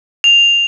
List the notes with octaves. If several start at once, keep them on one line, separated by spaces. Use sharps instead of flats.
F7